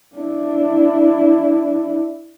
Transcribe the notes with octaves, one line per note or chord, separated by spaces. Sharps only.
D4 E4